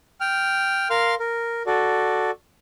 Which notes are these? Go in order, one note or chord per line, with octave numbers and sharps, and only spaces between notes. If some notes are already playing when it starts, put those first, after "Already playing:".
G5 F6
A#4 F5 C6 F6
A#4
F#4 A4 D5